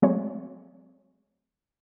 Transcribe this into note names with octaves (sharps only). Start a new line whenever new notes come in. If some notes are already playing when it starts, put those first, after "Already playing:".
F#3 G#3 A3 C4 C#5